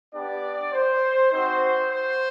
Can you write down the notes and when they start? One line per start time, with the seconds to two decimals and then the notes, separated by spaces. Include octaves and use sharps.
0.14 B3 D4 G4 D5
0.73 C5
1.32 C4 D#4 F#4 C5
1.91 C5